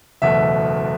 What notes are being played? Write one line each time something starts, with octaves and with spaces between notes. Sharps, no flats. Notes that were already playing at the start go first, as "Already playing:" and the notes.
F#1 E2 B2 A3 E5